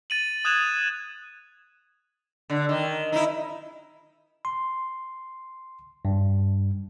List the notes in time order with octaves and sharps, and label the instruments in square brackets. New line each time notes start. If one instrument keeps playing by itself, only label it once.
[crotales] A6 D#7 F#7
D#6 F#6 G#6 E7 F7
[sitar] D3
D#3
D#4 E4
[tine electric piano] C6
G2